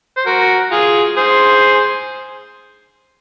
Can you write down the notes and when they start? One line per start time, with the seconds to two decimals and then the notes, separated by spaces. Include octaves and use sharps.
0.17 C5
0.26 F#4 A#4
0.71 F4 G#4
1.16 G#4 C5